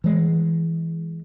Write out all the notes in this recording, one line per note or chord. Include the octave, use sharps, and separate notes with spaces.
E3 G#3